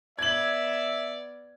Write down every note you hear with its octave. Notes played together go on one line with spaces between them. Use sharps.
B3 D5 E5 G#6 F#7